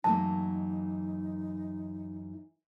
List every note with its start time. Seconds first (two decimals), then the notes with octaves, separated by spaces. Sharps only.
0.04 F#2 E3 A#3 D#4 A5